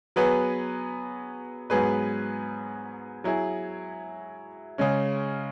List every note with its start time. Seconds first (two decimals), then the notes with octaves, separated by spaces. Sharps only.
0.16 F#3 B3 G#4 B4
1.70 G#2 F#3 B3 G#4 B4
3.24 F#3 E4 G#4
4.78 C#3 G#3 C#4